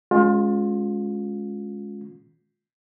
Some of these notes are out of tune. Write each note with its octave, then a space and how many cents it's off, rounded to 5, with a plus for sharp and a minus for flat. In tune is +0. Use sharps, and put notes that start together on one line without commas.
G#3 +10 C#4 +0 F4 +30